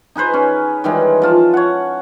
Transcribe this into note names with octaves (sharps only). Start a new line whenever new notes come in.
D#4 G#4 B4 C5
C#4
D#3 E3 G3 G#3
F3 F4 A5
C#5 F#5